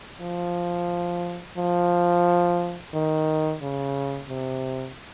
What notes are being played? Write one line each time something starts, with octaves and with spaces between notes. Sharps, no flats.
F3
F3
D#3
C#3
C3